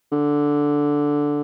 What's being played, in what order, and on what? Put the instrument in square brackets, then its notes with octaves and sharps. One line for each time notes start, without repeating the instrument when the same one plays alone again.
[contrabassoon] D3